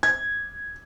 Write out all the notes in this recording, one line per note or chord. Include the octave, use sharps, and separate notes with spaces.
G#6